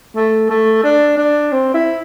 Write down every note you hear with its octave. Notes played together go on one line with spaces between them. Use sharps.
A3
A3
D4
D4
C4
E4